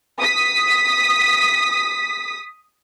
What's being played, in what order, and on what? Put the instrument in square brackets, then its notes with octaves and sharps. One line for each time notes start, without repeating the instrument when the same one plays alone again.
[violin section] D#6 B6